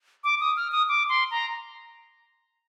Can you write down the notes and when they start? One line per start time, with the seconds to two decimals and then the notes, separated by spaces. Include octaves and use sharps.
0.24 D6
0.41 D#6
0.57 F6
0.72 D#6
0.89 D6
1.09 C6
1.31 A#5